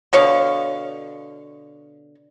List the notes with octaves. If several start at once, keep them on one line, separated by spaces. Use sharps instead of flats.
B2 D3 C#5 F5